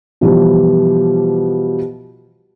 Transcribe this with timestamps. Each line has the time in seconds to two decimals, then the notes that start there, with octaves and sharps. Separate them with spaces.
0.21 B2 E3 F3 G3